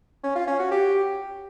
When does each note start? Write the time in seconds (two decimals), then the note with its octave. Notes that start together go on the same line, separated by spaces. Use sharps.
0.24 C#4
0.36 F4
0.47 C#4
0.59 F#4
0.71 G4